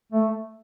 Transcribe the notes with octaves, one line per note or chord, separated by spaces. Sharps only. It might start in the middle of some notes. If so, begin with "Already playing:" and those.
A3